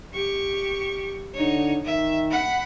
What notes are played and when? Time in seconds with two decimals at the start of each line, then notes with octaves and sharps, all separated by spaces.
0.14 G4 C#6
1.34 D3 D#4 C#5
1.85 D#3 E5
2.31 F#5 B5